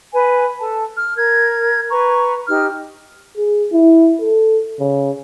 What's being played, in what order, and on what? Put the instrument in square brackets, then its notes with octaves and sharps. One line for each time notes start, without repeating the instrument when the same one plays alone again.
[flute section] B4 G#5
A4 A5
F6
A#4 G#6
B4 A#5 C#6
D#4 G4 F6
[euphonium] G#4
E4
A4
C#3